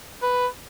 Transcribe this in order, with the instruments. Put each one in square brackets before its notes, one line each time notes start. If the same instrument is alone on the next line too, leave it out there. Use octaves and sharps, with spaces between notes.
[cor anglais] B4